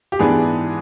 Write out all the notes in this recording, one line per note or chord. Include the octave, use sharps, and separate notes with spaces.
G4
G#2 E3 G#3 B3 D4 G#4